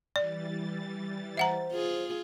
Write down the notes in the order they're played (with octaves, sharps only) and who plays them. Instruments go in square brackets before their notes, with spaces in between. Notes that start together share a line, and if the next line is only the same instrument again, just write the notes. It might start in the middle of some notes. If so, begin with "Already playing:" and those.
[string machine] E3 G3 A6 [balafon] D5
[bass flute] C5 [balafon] E5 F#5 A#5
[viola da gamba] F4 G#4